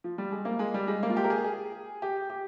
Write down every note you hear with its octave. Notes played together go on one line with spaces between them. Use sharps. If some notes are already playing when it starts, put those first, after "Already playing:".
F3
G3
G#3
A#3
G#3
G3
G#3
A#3
F4
G4
A#4
G#4
G#4
G4
G4